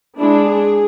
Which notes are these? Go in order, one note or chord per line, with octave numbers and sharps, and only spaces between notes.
G#3 D4 E4
G#4